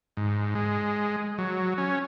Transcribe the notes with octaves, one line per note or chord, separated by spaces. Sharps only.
G#2
G#3
F#3
C#4